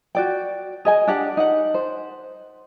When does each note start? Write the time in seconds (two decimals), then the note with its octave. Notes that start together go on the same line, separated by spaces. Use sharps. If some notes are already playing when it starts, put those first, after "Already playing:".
0.15 F#4 D5 G5
0.85 G#4 D#5 G#5
1.07 D4 G4 F#5
1.37 D#4 F#5
1.74 C5